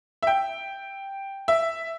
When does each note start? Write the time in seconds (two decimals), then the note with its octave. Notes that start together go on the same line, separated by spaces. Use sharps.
0.23 E5
0.27 G5
1.48 E5